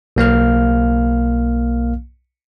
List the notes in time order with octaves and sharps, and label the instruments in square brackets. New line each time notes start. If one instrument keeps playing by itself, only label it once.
[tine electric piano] B1 A#3 F5 F6